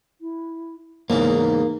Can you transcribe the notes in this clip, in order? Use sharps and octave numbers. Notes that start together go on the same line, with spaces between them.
E4
E2 G#2 C#3 A#3 D#4
D#4